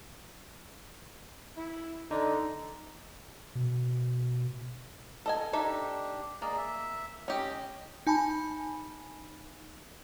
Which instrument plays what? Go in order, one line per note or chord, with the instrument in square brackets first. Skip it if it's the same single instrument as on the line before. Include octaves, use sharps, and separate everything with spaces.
[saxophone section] E4
[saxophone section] D3 [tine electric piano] D#4
[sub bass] B2
[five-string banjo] A4 D#5 G#5
[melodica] D4 G4 [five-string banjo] D#4 A4 E5
[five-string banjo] A#3 [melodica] G#4 D5 D#5
[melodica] E5
[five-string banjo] C#4 G4 [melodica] D#5
[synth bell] D#4 G#5 A5 B5